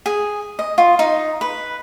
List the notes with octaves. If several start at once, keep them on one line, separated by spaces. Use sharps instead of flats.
G#4
D#5
F4
D#4
B4